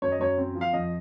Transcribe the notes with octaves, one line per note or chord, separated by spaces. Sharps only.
F#2 C#5
D#5
F#2 C#5
C4
F3
F5
F2 D#5